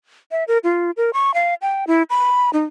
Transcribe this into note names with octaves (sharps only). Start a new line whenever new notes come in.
E5
A#4
F4
A#4
C#6
F5
G5
E4
B5
D#4